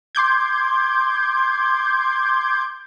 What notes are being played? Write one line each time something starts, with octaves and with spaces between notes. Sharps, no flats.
C6 D6 G6 G#6